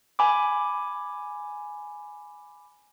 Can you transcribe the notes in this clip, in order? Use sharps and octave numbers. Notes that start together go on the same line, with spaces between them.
G#5 B5 D6